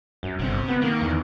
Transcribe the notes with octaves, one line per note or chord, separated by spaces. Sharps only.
F#2
G1 C3 C4
B3
D#3 A#3
E2